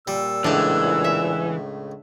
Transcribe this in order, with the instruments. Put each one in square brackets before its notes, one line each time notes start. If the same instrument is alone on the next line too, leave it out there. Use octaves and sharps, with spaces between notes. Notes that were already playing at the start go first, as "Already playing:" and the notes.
[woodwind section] A#2 E6 [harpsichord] G3
[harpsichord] C#2 A2 [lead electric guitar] E3 [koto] D4 A5
[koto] E5